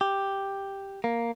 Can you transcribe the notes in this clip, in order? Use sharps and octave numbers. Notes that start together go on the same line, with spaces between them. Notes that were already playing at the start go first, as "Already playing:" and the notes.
G4
A#3